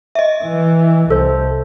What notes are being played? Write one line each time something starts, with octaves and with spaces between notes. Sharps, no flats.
D#5 E5
E3
C2 A4 C5